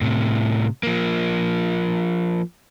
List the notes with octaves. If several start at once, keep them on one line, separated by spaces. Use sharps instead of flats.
A2 C3
F3 A#3